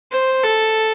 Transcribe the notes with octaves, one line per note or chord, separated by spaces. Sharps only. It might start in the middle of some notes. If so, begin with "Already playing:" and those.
C5
A4